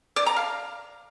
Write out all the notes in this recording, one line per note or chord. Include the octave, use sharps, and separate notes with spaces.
D5
A#5
F5